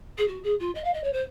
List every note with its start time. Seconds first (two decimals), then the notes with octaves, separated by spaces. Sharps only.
0.18 G#4
0.28 F#4
0.44 G#4
0.60 F4
0.75 D#5
0.84 F5
0.94 D#5
1.04 C#5
1.13 C5